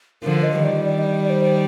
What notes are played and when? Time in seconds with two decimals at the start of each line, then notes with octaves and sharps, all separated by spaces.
0.23 D3 F3 A#4
0.43 D#5
0.63 D#3 G3 D5
0.83 D5
0.98 D#5
1.04 D5
1.22 D5
1.30 C5